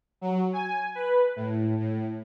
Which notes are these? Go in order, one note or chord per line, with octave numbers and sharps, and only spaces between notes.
F#3
G#5
B4
A2
A2